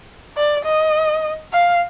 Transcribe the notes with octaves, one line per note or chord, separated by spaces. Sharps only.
D5
D#5
F5